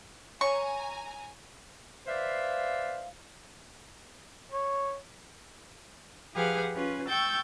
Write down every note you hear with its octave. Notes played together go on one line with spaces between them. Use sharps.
C#5 G#5 A#5 C#6
B4 C5 D5 E5 F5
C#5
F3 G4 G#4 B4 F5 F#5
C#4 F4 B4
G5 C#6 E6 G6 A6